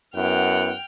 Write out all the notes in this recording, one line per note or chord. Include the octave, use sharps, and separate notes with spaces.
F#2 B3 E4 F#5 G5 F6